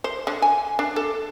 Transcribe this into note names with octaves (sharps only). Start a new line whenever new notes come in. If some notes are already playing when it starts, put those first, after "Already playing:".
C5
D3
G#5
D4
A4